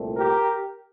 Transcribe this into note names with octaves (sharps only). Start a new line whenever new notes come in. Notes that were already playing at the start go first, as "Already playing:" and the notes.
Already playing: C2 A#2 A3 C4
G4 A#4